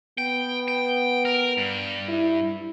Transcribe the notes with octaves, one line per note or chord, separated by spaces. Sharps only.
B3 G5
G5
A#4
G2
E4